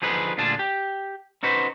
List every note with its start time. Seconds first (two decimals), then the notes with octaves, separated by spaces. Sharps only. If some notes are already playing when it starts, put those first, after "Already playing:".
0.02 D3 F3 D#4 G#4 B4
0.38 D2 A#2 D4 F4 G#4 A5
0.59 G4
1.43 C#4 D#4 F#4 B4 C5